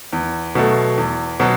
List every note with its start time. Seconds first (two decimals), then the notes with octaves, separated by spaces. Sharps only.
0.13 E2
0.55 B2 F#3 A3
0.98 E2
1.40 B2 F#3